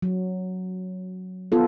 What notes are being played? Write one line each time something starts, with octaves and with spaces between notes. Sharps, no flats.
F#3
B3 F4 A4